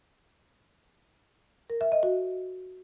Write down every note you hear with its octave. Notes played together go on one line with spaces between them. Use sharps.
A#4
E5
D#5
F#4